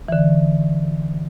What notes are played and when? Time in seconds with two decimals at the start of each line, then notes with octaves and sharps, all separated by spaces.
0.08 E3
0.12 D3